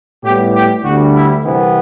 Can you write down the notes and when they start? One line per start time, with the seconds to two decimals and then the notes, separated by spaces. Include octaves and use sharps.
0.23 A2 G3 B3 G4
0.54 G4
0.84 D2 D3 G3 F#4
1.15 E4
1.45 C2 C3 E3 B3